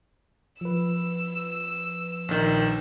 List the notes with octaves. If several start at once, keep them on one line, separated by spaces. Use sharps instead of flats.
F3 B4 E6
A#1 D#3